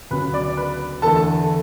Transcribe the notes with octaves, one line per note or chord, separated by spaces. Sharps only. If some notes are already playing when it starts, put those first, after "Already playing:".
D2 C#3 F#3 B3 B4 B5
D5 D6
B4 B5
E2 D3 A3 A4 A5